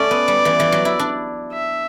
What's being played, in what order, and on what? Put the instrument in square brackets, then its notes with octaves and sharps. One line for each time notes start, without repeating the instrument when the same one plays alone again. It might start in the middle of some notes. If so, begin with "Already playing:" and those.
Already playing: [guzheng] A3 C#4 [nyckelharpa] D5
[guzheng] B3
G3
E3
E3
F#3
E4
D4
[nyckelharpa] E5